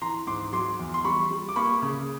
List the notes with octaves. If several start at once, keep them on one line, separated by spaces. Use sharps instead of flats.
E3 A#5 C6
G#2 C6 D6
F#3 C6 D6
E2
C6
G3 B5 C#6
G3
D6
A#3 B5 C#6
C#3